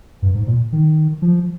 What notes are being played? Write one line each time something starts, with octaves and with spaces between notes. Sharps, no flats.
G2
G#2
A#2
D#3
F3